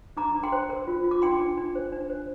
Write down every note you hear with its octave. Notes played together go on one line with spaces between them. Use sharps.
D4 A#5 D6
D4
G5 C6
C5
A#4
F4
F4
D6
D4 G5 C6
D4
D4
C5
D4
C5